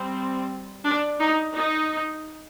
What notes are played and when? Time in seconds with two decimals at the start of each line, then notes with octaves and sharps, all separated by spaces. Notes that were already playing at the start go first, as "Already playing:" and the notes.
Already playing: G3 C4
0.85 D4
1.20 D#4
1.55 D#4